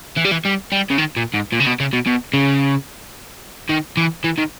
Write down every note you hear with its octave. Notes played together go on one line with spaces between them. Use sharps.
E3
G3
E3
G3
G3
C#3
D#3
A#2
G#2
A#2
C#3
B2
C#3
B2
B2
C#3
D#3
E3
E3
D#3